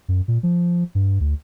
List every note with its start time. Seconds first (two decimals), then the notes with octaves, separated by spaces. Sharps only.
0.08 F#2
0.28 A#2
0.43 F3
0.95 G2
1.21 D2